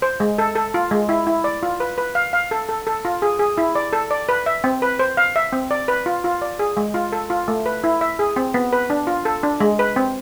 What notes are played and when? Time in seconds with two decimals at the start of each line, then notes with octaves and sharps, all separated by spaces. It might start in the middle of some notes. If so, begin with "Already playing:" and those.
0.02 C5
0.20 G#3
0.38 A4
0.56 A4
0.74 F4
0.91 G#3
1.09 E4
1.27 E4
1.44 D5
1.63 F4
1.80 B4
1.98 B4
2.15 F5
2.33 F5
2.51 A4
2.69 A4
2.87 A4
3.05 F4
3.22 G#4
3.39 G#4
3.58 E4
3.75 D5
3.93 A4
4.11 D5
4.29 B4
4.46 E5
4.64 C4
4.82 B4
4.99 C5
5.17 F5
5.36 E5
5.52 C4
5.71 D5
5.88 B4
6.06 F4
6.24 F4
6.42 D5
6.59 G#4
6.77 G#3
6.94 F4
7.12 A4
7.30 F4
7.48 A3
7.66 B4
7.84 E4
8.01 E5
8.19 G#4
8.36 C4
8.54 B3
8.73 B4
8.90 D4
9.07 F4
9.25 A4
9.43 D4
9.61 G#3
9.79 B4
9.96 C4